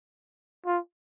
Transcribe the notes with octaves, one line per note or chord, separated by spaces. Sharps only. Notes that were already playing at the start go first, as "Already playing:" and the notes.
F4